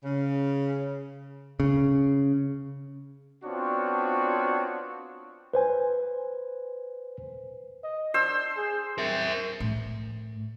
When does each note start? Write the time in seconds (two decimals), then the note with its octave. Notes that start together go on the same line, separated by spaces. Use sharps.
0.04 C#3
1.60 C#3
3.44 B3 C4 D4 F4 F#4 C#5
5.54 B4 C5 G#5
7.84 D#5
8.14 D4 C5 E6
8.57 G#4
8.98 C4 A#4 E5
9.60 A2